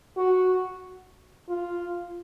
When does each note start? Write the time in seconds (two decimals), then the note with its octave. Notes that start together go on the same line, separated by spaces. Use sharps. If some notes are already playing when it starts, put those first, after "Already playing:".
0.17 F#4
1.49 F4